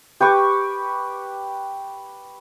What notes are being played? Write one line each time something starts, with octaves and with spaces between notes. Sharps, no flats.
G4 B4 C#6 D6